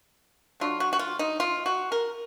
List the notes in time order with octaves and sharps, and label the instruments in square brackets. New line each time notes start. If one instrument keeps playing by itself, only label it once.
[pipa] D3 F#3 D4 F4
F#4
F#4
F4
D#4
F4
F#4
A#4